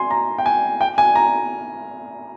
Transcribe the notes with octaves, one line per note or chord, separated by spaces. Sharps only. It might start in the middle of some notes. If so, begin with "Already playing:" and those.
Already playing: G#5 C6
A#5
G5
G#5
G5
G#5
A#5